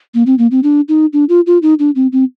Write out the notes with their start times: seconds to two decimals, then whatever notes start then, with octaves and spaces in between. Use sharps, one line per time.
0.14 A#3
0.26 C4
0.38 A#3
0.51 C4
0.63 D4
0.89 D#4
1.13 D4
1.29 F4
1.47 F4
1.62 D#4
1.79 D4
1.96 C4
2.12 C4